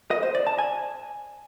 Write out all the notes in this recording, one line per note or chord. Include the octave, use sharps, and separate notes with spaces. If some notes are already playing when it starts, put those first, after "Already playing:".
D#5
C5
D5
A5
G#5